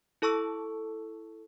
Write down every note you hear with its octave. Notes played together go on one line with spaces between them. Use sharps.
E4 A4 A5 C#6 E6